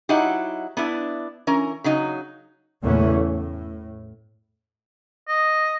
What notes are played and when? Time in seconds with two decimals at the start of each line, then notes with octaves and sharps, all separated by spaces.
0.09 F#3 D#4 E4 G4 F#5
0.77 B3 D4 E4
1.47 E3 C#4 A#4
1.84 C#3 F#3 D#4
2.83 E2 A#2 C#3 E3 A3 C#4
3.11 A2
5.29 D#5